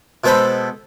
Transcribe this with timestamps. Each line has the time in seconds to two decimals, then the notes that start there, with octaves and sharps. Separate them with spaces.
0.24 B2 G#3 A4 C5 B5